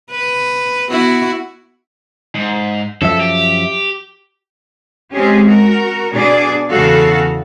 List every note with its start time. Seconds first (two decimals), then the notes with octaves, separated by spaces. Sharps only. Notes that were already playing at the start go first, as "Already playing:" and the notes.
0.11 B4
0.89 B3 E4 F#4
2.35 G#2
3.02 F#2 F3 A4 E5
3.21 G4
5.13 G#3 C4 C#4 G4 G#4
5.47 F#4 A#4
6.13 B2 D4 G#4 D5
6.71 E2 C#3 F#4 A4 F5